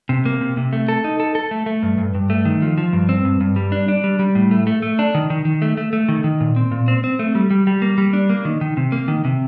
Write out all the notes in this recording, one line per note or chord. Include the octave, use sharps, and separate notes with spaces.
C3
A#3
C3
C3
A3
A4
D#4
A4
A4
A3
A3
G2
G2
G2
A3
D#3
F3
F3
G2
C4
G2
G2
G3
D4
D4
G3
G3
A2
A3
A3
A3
D4
D#3
D#3
D#3
A3
A3
A3
D#3
D#3
A#2
C4
A#2
C4
C4
A3
G3
G3
G3
A#3
G3
D4
A#3
D#3
D#3
C3
A#3
D#3
C3